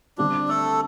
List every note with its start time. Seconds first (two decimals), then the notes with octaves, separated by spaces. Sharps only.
0.18 D3 G3 C4 D4 G4 D5
0.48 A3 A4